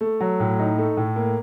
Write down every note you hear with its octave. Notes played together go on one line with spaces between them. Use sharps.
A3
F#3
A2
D#4
A3
A2
A#3